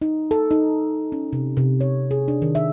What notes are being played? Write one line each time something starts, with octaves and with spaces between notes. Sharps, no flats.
D#4
A4
D#4
C#4
C3
C3
C#5
G#4
D4
D#3
E5